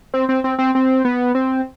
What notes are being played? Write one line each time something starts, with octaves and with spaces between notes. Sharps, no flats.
C4
C4
C4
C4
C4
B3
C4